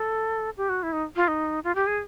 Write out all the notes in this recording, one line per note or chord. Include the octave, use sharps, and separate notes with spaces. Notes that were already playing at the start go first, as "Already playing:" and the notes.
Already playing: A4
G4
F#4
E4
D#4
F4
D#4
F4
G4
G#4